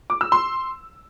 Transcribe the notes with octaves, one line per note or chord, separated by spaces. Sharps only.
D6
E6
C6